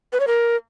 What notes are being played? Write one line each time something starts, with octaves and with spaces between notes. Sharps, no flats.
B4
C#5
A#4